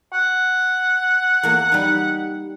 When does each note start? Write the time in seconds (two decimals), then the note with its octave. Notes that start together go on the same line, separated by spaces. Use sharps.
0.13 F#5
1.43 E2 A#3
1.72 G3 D#4